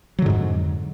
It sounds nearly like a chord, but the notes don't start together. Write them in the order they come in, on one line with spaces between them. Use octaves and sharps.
F#3 D3 G#2 F2